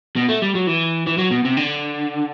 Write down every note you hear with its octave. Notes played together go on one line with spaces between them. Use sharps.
B2
A3
G3
F#3
E3
E3
F#3
B2
C3
D3